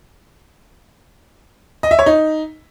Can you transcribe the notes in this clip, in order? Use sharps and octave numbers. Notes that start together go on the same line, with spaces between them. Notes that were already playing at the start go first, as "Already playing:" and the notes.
D#5
E5
C#5
D#4